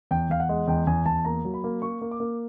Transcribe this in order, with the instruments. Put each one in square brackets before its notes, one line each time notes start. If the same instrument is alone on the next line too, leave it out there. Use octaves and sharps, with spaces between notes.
[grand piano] E2 G5
E2 F5
F#5
G#3
E2 G5
E2 G#5
E2 A5
A#3 A#5
F#3
B5
A#3
A#3 C#6
A#3
D6
A#3